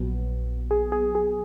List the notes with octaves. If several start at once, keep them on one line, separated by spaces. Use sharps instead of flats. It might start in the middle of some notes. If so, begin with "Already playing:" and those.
Already playing: A#1 A#2 F#3 B3
G#4
G#4
G#4